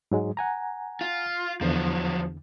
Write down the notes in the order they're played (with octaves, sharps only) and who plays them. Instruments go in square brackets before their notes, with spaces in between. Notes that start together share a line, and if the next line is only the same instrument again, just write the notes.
[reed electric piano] G#2 F#3 G#3
F#5 G#5 A#5
[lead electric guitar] F4
[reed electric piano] E2 D3 [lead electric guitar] F3 F#3